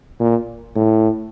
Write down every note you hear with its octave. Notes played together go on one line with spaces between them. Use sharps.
A#2
A2